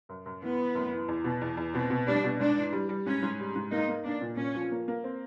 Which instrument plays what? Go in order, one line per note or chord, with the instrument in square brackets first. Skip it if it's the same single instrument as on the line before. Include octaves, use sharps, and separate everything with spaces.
[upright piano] F#2
F#2
[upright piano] E3 [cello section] B3
[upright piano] E3
F#2
E3
E2
B2
E2
E2
[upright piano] B2 [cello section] C4
[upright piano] B2
[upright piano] G3 [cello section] D4
[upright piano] B2
[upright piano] G#2 [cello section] D4
[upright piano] E3
G3
G3
[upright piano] G#2 [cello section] C#4
[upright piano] G#2
G3
G#2
[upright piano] A#3 [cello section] D#4
[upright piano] A#3
[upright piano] A#3 [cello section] D4
[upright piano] A#2
[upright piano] A#2 [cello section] C#4
[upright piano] F3
A#3
A#3
C4